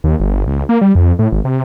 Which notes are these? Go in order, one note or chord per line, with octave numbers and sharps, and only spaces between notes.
D#2
G1
C#2
A#3
G3
F2
A2
G#1
C3